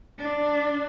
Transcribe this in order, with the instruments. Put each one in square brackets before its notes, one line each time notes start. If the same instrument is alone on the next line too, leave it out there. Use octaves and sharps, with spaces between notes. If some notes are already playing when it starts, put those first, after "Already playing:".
[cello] D4